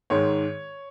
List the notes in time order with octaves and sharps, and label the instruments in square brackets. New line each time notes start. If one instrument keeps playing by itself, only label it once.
[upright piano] G#2 D#3 G#3 C#5